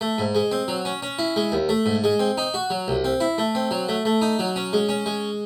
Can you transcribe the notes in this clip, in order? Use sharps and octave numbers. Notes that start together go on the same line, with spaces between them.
A3
G#2
G#3
C4
F#3
C#4
C#4
E4
G#3
D#2
A3
G#2
G#3
C4
D#4
F#4
F#3
C2
C4
E4
A3
C4
F#3
A3
A3
D#4
F#3
C#4
G#3
C#4
G#3